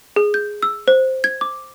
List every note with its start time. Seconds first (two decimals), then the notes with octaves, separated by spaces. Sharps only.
0.16 G#4
0.34 G6
0.63 E6
0.88 C5
1.24 G#6
1.41 D6